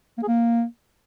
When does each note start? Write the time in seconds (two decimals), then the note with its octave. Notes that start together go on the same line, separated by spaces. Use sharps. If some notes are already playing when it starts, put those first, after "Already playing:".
0.18 A#3
0.23 G#4
0.28 A#3